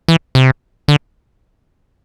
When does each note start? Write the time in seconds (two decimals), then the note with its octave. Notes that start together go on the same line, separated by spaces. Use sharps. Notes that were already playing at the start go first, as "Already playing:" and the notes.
0.08 E3
0.35 C3
0.88 D3